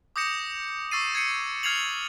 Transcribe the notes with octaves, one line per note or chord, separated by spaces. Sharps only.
D6 D#6 G6 A#6 C#7 E7
C#6 E6 A6 C7 D#7
G#6 C7 C#7 D#7
F6 G#6 C7 F7 F#7